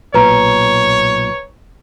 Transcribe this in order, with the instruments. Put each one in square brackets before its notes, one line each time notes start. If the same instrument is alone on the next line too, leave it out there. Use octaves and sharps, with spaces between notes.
[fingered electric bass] B1 A#2 [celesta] B4 A#5 [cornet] C#5